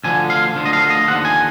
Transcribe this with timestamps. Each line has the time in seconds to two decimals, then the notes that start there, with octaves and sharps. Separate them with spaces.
0.04 D2 D3 F3 G#5
0.30 F5
0.55 D2 D3 F3
0.65 D#5
0.73 F5
0.90 D#5
1.08 D#2 D3 F3 F#5
1.25 G#5